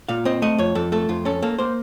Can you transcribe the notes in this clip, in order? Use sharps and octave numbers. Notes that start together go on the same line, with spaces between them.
A#2 F5
C4 D#5
A3 D#5
F2 C#5
F2 A4
A3 A4
F2 F4
C#4 A4
A#3 A4
A#3 C5